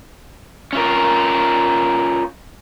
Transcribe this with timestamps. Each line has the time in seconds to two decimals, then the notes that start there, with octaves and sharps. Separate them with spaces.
0.73 C#4 F4 A#4